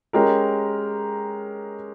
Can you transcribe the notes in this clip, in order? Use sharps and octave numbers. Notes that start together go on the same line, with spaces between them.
G#3 C#4 G4 A#4